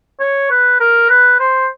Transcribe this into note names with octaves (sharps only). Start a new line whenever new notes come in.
C#5
B4
A#4
B4
C5